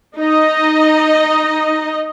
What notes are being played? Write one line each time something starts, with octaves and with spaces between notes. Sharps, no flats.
D#4 D#5